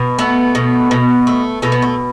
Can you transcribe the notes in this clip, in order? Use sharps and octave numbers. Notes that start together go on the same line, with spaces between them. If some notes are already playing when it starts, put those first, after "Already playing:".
Already playing: B2
A3 B3
B2
B2
A3
B2 A3
B3
A3